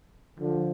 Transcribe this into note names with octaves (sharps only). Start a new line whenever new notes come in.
D3 F3